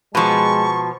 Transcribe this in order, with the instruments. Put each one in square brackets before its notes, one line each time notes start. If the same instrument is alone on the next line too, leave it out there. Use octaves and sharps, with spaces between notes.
[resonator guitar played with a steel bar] B2 F3 [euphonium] G#3 [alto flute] A5 [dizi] C#6